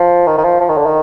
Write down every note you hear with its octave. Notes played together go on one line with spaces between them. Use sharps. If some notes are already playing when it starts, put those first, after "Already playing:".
Already playing: F3
D#3
D#3
F3
F3
D#3
D3
D#3